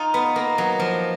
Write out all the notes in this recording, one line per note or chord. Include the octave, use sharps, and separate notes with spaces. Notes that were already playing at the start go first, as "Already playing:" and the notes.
Already playing: D#4 F4
B3
A#3
F#3
F3